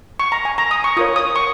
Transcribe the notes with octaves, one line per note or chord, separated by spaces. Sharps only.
C#6
A#5
G#5
A#5
D#6
C#6
F4 A#4 C#5 D#6
D#6
C#6